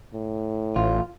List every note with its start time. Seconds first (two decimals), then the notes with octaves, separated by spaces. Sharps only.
0.14 A2
0.76 A1 F4